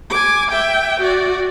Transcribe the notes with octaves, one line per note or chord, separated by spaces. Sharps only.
G#5 D6
E5 G5
F#4 D5